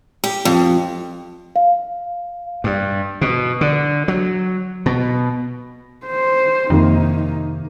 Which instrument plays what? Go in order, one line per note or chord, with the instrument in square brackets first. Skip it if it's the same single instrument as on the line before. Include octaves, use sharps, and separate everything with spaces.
[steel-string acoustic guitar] G4
F2
[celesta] F5
[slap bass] G2
B2
D3
F#3
B2
[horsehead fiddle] C5
[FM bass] F2 [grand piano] C3 D#3 A#3 [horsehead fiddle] D#4